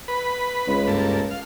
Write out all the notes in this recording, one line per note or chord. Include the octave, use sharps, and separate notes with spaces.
B4
C#2
G2 A#3 A4
F5